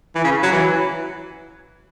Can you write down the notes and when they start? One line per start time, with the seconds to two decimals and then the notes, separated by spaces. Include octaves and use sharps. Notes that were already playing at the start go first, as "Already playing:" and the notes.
0.15 E3
0.24 C#3
0.43 F#3
0.52 E3